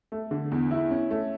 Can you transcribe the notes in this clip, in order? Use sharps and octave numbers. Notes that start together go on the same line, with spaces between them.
A3
D3
E2
E4
C#4
A3